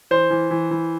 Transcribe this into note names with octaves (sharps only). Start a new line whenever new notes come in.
E3 C5
E3
E3
E3